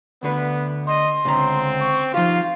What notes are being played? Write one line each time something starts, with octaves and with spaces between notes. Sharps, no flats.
D2 D3 B3 B4
D#5 C6
C#2 D3 C4 A#5
C#6
F3 D#4 F4 G4 F5